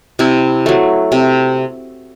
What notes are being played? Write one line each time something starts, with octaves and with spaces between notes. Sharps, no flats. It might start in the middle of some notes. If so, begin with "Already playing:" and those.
C3 E4
F#3 A3
C3